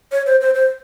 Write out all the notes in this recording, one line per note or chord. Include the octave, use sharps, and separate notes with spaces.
C#5
C5
C5
C5